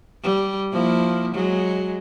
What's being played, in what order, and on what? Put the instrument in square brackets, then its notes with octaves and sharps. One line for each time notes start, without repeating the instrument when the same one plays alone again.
[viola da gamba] G3
F3 A#3 E4
F#3 G#3